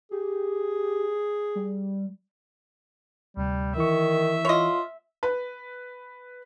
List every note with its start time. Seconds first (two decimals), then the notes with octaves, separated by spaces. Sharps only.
0.11 G4 G#4
1.55 G3
3.37 D2 C3 G3
3.76 D#3 E3 E4 E5 C#6
4.45 F4 C#5 D#5
5.23 B4